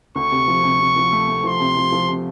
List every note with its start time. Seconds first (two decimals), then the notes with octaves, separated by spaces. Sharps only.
0.15 D2 C#6
0.31 C3
0.48 F3
0.64 C3
0.80 C3
0.96 F3
1.12 A3
1.28 A3
1.44 F3 C6
1.60 C3
1.76 F3
1.92 F3
2.09 C3